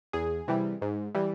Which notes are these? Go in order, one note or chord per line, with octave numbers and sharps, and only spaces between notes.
E2 G#4
C3 E3 G3
G#2
E3 G3